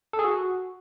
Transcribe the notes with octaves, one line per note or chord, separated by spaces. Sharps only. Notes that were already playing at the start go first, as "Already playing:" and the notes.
A4
G#4
F#4